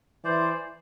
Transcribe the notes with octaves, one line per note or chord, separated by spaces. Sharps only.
E3 C5 D5